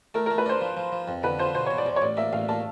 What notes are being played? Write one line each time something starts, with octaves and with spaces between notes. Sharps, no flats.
A3 A#4
A3 A#4
B4
D4 C5
F3
F3
F3
F2
D3 B4
F3 C5
B2 C5
B2 C#5
D5
E2
C#5
A1 D5
A#3 E5
A1 F5
A#3 A5